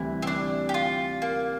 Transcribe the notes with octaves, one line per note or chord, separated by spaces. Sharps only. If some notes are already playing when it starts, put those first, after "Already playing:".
Already playing: D2 C3 E3 G3 E4
C4
D4
G4
F4
A#3